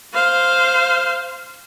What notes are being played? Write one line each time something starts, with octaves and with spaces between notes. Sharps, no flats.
C5 F5